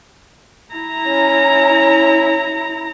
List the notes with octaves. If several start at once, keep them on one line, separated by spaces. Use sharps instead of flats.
E4 A#5
C#4